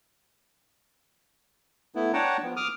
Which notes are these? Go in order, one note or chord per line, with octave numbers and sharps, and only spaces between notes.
A3 B3 E4
D4 C#5 F#5 G5 A5 A#5
F3 B3
D6 D#6 F6